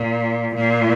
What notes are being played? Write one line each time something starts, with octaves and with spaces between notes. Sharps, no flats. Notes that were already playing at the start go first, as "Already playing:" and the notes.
Already playing: A#2
A#2